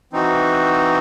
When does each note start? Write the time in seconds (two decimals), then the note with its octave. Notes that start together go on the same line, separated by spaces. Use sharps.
0.13 E3 C4 D#4 F#4